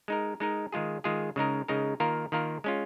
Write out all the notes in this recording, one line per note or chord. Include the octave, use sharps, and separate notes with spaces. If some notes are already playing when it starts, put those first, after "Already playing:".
G#3 D#4 A#4
G#3 D#4 A#4
D#3 G#3 F4 G#4
D#3 G#3 F4 G#4
C#3 G#3 D#4 A#4
C#3 G#3 D#4 A#4
D#3 A#3 F4 A#4
D#3 A#3 F4 A#4
G#3 C#4 F4